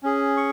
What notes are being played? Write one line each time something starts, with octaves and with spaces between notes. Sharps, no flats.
C#4 G#4
C#6